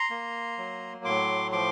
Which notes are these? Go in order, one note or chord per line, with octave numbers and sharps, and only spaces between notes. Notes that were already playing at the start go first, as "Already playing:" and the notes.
Already playing: A#5 C6
A#3
F#3
A2 C6 D6
F3 C6 D6